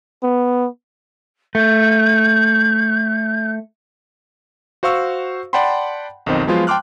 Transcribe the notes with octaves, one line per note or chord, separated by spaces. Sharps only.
B3
A3 G6
F#4 C5 F5 C#6 E6
D5 F#5 G5 A5 B5 C6
B1 F2 D#3 C4 D#5
F3 F#3 G#3 B3 F4 C5
G5 A5 C6 D6 F6 F#6